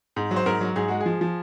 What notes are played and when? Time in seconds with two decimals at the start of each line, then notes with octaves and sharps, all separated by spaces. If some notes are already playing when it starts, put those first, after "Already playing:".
0.16 G#2
0.31 F#3
0.36 C5
0.46 G#2 A#4
0.61 F#3
0.76 G#2 G#4
0.88 G#3 F#4
1.00 G#4
1.06 F3
1.21 F3